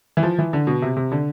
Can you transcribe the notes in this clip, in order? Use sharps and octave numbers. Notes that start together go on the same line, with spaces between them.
E3
F3
E3
D3
B2
C3
C3
D3